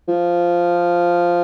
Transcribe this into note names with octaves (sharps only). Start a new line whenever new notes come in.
F3